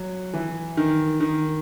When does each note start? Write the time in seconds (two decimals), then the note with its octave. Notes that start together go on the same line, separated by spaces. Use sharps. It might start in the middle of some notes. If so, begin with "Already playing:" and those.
Already playing: F#3
0.33 E3
0.77 D#3
1.20 D#3